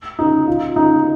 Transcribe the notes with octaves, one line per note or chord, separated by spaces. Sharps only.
D#4
F4
D#4